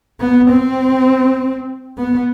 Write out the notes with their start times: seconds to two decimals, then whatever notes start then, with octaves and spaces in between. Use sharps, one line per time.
0.20 B3
0.50 C4
1.98 B3